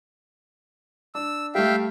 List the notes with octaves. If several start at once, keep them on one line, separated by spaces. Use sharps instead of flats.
D4 E6
G3 A3 E5 F5 G5